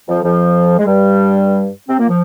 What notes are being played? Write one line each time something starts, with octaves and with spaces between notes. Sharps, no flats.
F2 F3
F2 F3
G#3
G2 G3
C3 C4
A#2 A#3
F3